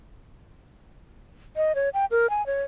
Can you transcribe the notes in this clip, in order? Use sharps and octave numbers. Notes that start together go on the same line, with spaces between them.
D#5
C#5
G5
A#4
G#5
C#5